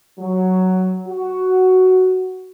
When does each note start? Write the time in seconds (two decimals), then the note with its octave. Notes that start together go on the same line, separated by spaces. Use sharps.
0.19 F#3
1.08 F#4